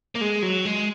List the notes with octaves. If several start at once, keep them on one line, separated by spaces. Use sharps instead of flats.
A#3
G#3
F#3
G#3